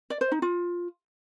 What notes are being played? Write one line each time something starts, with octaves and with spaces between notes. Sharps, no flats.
D5
C5
D#4
F4